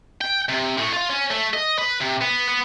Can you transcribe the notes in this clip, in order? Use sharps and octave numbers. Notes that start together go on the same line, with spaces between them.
G5
C3
A2
F4
C#4
A3
D#5
B4
C3
B3
B3